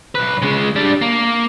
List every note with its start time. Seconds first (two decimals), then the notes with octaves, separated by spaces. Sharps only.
0.15 B1 B4
0.42 C#3 G#3
0.76 G3 D4
1.02 A#3